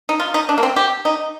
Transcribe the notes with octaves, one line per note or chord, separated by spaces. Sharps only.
D#4
F4
D#4
D4
A#3
C4
G4
D#4